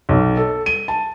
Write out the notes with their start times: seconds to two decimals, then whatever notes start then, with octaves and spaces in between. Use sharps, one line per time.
0.09 B1
0.37 A4
0.66 D#7
0.88 A5